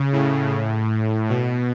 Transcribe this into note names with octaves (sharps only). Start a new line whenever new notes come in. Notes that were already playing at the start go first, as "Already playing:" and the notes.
Already playing: C#3
A2
B2